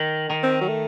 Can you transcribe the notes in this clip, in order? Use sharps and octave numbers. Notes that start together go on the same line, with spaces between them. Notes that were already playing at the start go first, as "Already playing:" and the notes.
Already playing: D#3
D#3
C4
F#3
A3